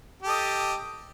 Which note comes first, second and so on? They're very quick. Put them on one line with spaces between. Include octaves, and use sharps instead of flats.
G4 A4 D#5